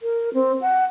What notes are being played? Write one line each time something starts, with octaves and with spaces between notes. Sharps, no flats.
A#4
C4
F#5